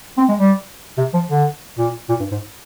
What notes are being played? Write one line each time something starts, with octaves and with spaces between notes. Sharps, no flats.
C4
G#3
G3
C3
F3
D3
A#2
A#2
G2
G#2